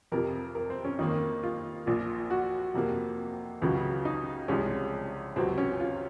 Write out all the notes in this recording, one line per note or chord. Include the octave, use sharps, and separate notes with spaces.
F2 C3 F3 A#4
A#4
C4
C#4
F2 D#3 A#3 D#4
F4
A#1 A#2 F3
F#4
F2 C3 F3 A#3
C#2 C#3 F#3
D#4
C2 C3 F3 G#3 C#4
C#2 C3 F#3 C4
C#4
F4